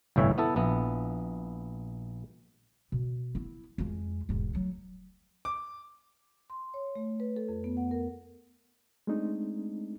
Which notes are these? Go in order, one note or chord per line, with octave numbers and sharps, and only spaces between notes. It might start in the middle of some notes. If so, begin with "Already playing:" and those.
G1 C2 A2 E3 C#5 E5
B3 E4 A4
A#1 B3 E4
B2
B3 E4
F2 G#3
E1 G#2
F#3 A3
D6
C6
C#5
A3
B4
A4
F2
B3
F#5
A#4
G#3 A3 C4 D4 D#4